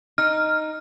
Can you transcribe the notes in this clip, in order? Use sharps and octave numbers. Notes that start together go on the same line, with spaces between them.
D#4 F6